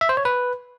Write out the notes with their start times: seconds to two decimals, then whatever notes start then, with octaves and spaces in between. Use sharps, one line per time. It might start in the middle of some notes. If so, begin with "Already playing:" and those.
0.01 E5
0.09 C5
0.17 C#5
0.25 B4